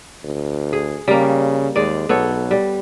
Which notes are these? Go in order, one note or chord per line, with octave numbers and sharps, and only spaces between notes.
D2
G#4
C#3 G3 A#3
D#2 G#3 D5
B1 B3 A4 C#5
G3